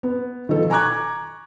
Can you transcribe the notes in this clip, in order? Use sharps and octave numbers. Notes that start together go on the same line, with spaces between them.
B3
D#3 F3 A4
G#5 A#5 C#6 D6 F#6 G#6